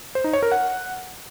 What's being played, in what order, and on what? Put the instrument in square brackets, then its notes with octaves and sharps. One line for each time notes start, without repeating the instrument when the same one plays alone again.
[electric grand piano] C5
D#4
C#5
A#4
F#5